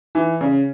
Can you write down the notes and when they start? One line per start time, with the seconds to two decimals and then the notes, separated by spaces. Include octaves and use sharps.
0.15 E3
0.41 C#3